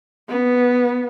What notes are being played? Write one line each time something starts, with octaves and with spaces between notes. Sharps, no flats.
B3